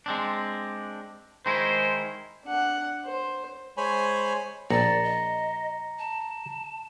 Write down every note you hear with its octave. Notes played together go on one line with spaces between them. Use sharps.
G#3 C4 D4
D#3 G#3 E4 C5
D4 F#5
C5
G#3 C5 C#5 G#5 B5
A#1 D5 A#5 A#6 C#7
D#5
A5